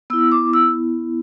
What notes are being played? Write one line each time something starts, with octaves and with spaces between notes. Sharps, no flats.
B3 E4 E6
D6
E6